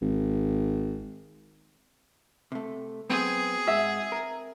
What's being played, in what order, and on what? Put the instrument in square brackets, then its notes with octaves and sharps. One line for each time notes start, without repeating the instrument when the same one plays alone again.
[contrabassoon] G#1
[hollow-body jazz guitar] C3 A3
[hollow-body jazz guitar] F#3 B3 [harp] C4 [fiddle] G#4
[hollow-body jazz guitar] G#2 F#4 [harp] E5
[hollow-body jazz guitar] A#4